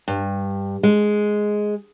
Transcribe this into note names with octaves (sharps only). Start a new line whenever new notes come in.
G2
G#3